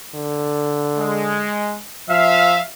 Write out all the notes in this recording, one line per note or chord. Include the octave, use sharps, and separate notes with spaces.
D3
G#3
F3 E5 F5